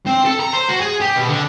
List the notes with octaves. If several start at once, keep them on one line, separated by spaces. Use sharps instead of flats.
C4
A4
A#5
C5
F#4
G#4
G4
B2
D3